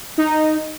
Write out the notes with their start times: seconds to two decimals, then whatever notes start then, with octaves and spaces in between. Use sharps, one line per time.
0.18 D#4